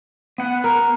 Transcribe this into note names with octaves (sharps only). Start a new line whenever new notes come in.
B3 F#5
A#4